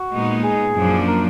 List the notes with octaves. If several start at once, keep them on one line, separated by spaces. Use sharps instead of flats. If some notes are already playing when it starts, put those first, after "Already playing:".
Already playing: F#4
A#2 G#3 B3 D#4
G#4
F#2 F3 A#3 D4
A#4